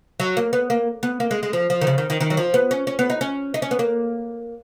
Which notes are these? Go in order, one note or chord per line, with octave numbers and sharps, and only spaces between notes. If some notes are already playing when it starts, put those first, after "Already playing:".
F#3
A#3
B3
A#3
B3
A#3
G#3
G#3
F3
F3
D#3
C#3
D#3
D#3
D#3
F#3
F3
B3
C#4
C#4
B3
D#4
C#4
D#4
C#4
B3
A#3